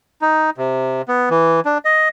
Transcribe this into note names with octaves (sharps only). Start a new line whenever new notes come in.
D#4
C3
B3
E3
D4
D#5